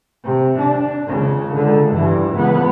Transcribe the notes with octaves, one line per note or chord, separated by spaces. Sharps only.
C3
D4
C#2 C#3
C#2 D3
G2 E3
C#2 B3